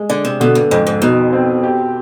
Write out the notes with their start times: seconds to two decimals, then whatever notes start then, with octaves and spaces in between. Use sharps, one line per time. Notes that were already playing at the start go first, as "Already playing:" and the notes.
Already playing: G#3
0.10 D3 D4
0.25 C3
0.40 B2 D3
0.55 G2
0.71 F2 G#2
0.87 G#2
1.02 B2 D#4
1.33 C4
1.64 G4